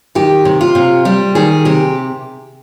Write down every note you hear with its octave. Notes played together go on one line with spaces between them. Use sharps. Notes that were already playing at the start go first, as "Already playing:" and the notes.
D#3 G4
C3
F4
C3
G3 G4
D#3 G#4
C3 G4